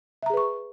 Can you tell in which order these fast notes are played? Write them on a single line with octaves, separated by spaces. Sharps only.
E5 A#5 G#4 B4 C#6